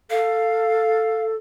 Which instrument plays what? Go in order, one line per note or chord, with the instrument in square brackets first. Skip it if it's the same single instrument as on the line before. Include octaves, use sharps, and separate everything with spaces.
[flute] A4 [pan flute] F5